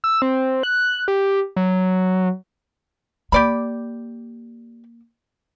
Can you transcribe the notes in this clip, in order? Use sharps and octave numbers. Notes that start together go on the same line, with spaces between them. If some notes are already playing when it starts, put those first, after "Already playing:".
E6
C4
F#6
G4
F#3
A#3 G4 D5 B5